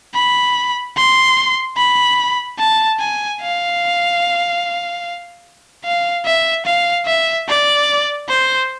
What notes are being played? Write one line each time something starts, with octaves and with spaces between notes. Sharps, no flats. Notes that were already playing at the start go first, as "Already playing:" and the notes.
B5
C6
B5
A5
G#5
F5
F5
E5
F5
E5
D5
C5